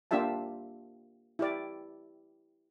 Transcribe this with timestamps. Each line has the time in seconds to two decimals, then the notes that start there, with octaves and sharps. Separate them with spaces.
0.11 A#3 D4 F4 G4 E5 A5
1.39 E4 G4 D5